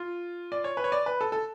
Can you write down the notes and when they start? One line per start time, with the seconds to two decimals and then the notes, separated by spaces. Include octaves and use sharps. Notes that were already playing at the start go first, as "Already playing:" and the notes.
Already playing: F4
0.52 D5
0.64 C#5
0.77 B4
0.84 C#5
0.92 D5
1.06 B4
1.21 A4
1.32 A4